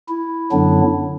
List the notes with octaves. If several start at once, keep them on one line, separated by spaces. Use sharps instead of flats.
E4
F#2 D3 F#3 B3 D4